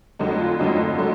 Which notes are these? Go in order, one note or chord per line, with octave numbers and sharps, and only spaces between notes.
F2 D3 F#3 A3 D#4
F4
F2 D3 F#3 A3 D#4
D3 F#3 A3